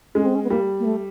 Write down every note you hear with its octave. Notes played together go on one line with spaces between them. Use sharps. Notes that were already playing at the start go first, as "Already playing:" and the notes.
G#3 C#4
C4
C#4
B3
G3 A#3
A#3
A3